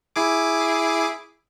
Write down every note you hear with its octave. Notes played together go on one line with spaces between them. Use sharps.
E4 G#4 D6